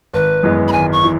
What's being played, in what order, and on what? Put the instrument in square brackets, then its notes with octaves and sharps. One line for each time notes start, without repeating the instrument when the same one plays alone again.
[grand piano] G#1 [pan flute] B4
[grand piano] F#2 E3 G#3 B3
[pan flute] B5
[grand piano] G#1 [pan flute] G#5
[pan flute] C#6
[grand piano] E3